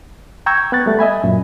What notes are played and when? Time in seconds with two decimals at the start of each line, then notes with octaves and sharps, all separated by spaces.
0.46 G5 A#5 C#6 E6 G6 G#6
0.72 B3 F#6 A6
0.86 G3 A3
0.99 D#5 E5 G#5 B5
1.24 F#2 A#2